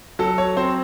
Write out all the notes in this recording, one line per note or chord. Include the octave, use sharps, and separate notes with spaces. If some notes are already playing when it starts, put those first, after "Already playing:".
F#3 A4
C#5
C4 C5